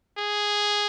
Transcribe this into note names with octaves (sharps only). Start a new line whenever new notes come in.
G#4